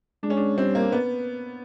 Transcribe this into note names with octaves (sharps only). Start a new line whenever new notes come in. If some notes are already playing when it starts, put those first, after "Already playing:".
G#3 D4
C#4
D4
G3 C4
A#3
B3